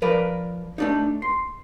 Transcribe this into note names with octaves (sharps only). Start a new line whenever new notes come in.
F3 A#4 B4 D5
A3 D4 D#4
C6